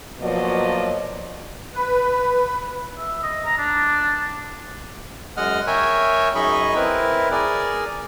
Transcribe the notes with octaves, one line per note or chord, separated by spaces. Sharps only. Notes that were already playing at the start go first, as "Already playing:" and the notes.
B2 F3 F#3 A#3 D5 D#5
B4
E5
D#5
A#5
D4
F#2 G#3 D#5 F#5 F6
A#4 C#5 E5 G5 G#5
F#2 D#4 G#4 D#5 B5 C#6
C4 E4 A#4 B4
G#4 A#4 D5